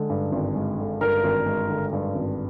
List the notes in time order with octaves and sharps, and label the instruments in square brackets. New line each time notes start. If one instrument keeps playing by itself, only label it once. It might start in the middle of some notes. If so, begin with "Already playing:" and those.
Already playing: [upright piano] D3 G#3
G2
G#1
G#3
D3
[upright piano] G2 [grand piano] A#4
[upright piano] G#1
G#3
D3
G2
G#1